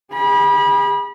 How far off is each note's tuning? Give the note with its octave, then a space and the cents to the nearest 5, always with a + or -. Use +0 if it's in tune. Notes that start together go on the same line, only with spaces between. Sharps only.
G#4 -35 B5 -30